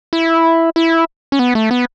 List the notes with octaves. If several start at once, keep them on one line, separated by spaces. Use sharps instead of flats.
E4
E4
C#4
B3
A3
B3